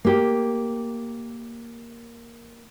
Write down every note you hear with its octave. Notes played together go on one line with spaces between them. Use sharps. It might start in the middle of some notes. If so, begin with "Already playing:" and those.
A#3 G4